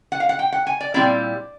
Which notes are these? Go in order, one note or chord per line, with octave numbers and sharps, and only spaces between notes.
F#5
F5
F#5
G5
F#5
G#5
D5
A#2 G3 C4 E4 D5